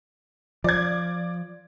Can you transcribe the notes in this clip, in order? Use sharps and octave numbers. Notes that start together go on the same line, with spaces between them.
F3 D5 G#6